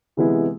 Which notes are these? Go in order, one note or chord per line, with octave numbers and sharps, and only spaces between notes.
C3 E3 G#3 B3 E4